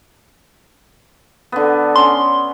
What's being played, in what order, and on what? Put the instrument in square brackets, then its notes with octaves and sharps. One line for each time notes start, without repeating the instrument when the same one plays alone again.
[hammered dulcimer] D3 B3
[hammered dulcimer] C#4 [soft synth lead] C6